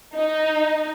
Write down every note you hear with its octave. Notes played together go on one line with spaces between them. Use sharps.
D#4